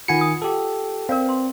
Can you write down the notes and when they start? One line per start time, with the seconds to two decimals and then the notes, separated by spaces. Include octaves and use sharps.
0.08 D#3 F4 F#5 G#5 C#7
0.21 D#6
0.42 G4 A4
1.09 C4 A#4 D5 F5
1.26 B4 C6